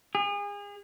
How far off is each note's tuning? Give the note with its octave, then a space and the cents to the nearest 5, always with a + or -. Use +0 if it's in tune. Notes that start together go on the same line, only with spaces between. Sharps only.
G#4 -35